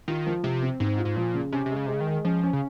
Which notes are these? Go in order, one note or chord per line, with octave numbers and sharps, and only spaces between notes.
D#3 F4
F3
C3 F3
C4
G#2 C4
F4
G#2
A#2 F3
C#3
C3 C#4
C3
G#3
C#3
C3 G#3
C#3
D#3
G#3
F3 C#4
C#4
C#3